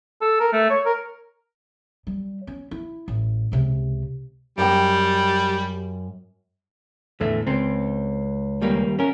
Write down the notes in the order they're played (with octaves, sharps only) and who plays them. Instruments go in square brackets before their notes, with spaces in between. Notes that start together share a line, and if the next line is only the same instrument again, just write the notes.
[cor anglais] A4
A#4
A3
C#5
A#4
[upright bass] G3
C#4
E4
A1
C#2 C3
[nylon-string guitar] F#2 G5 [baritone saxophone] G3
[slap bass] E2 A2 D3 [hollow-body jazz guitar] A3
[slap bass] C#2 [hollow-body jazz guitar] C4
[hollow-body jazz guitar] D#2 G3 A#3
C#4 A#4